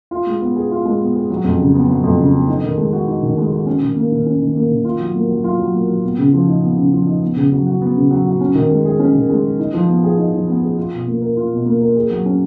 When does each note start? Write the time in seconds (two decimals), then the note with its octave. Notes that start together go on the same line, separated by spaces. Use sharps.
0.11 F4
0.26 G#3
0.41 B3
0.56 G#4
0.71 F4
0.85 G#3
1.01 B3
1.15 G#4
1.30 F#3
1.44 F2
1.59 C#3
1.75 B3
1.88 F#3
2.03 F2
2.18 C#3
2.34 B3
2.48 D#4
2.63 D#3
2.77 G#3
2.93 F#4
3.08 D#4
3.23 D#3
3.37 G#3
3.52 F#4
3.66 C#4
3.82 D#3
3.96 A#3
4.11 D#3
4.26 C#4
4.41 D#3
4.55 A#3
4.70 D#3
4.85 F4
5.00 F#3
5.14 A#3
5.29 F#3
5.44 F4
5.59 F#3
5.74 A#3
5.88 F#3
6.04 B3
6.18 C#3
6.33 F3
6.48 D#4
6.62 B3
6.78 C#3
6.93 F3
7.07 D#4
7.22 B3
7.36 C#3
7.52 F#3
7.66 F#4
7.81 B3
7.96 C#3
8.11 F#3
8.25 F#4
8.41 C#4
8.55 D#3
8.70 G#3
8.85 G#4
8.99 C#4
9.14 D#3
9.29 G#3
9.44 G#4
9.59 D#4
9.74 F3
9.88 B3
10.04 G#4
10.18 D#4
10.33 F3
10.47 B3
10.63 G#4
10.77 F4
10.92 B2
11.07 A#3
11.21 A#4
11.37 F4
11.51 B2
11.65 A#3
11.81 A#4
11.96 G#4
12.10 F#3
12.26 C#4